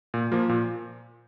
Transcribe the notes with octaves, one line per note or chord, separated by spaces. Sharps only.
A#2
F3 A#3 F4
A#2